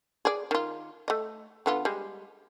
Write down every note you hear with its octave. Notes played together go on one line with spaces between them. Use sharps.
G#4 D5
D#3 F4
A3 D#5
D3 B3 F4
G3 G#3